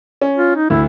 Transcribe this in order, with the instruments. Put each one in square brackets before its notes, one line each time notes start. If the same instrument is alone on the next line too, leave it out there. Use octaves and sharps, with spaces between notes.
[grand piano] C#4
[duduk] F4
D#4
[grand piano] D2 [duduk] E4